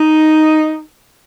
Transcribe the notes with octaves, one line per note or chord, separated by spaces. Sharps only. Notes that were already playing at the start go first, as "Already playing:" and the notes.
Already playing: D#4